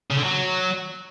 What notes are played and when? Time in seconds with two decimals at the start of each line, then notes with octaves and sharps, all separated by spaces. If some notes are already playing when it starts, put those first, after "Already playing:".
0.11 C#3
0.17 D3
0.24 F#3